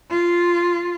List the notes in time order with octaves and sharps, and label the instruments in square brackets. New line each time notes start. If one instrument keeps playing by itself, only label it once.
[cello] F4